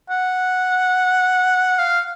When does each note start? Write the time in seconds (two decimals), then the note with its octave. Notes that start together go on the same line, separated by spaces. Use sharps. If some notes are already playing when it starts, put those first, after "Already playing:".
0.09 F#5
1.79 F5